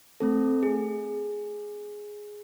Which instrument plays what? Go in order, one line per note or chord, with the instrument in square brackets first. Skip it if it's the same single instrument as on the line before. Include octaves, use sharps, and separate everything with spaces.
[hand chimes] A3 C4 A4
G#4